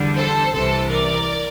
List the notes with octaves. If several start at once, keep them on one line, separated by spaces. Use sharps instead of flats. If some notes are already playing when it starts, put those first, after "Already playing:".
Already playing: E2 D3 G3
A4 C5
C2 C3 E3 A4 C5
A#4 D5